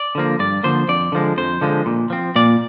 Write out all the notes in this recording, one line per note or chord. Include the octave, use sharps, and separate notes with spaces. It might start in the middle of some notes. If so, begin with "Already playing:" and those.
Already playing: D5
D3 F3 A#3
G2 D5
D3 F3 A#3 C5
F2 D5
D3 F3 G#3
F2 C5
D3 F3 G#3
A#2
F3 C4
A#2 D5